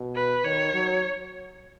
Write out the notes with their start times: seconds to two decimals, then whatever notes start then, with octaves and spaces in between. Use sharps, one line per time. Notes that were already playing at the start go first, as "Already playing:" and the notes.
Already playing: B2
0.15 B4
0.44 D#3 C#5
0.73 F#3